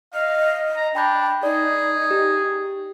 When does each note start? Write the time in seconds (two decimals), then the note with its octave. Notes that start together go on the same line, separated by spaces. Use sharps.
0.14 D#5 F5
0.76 A#5
0.95 D4 G5 A5 B5 G6
1.43 D#4 G#4 D5
2.11 G4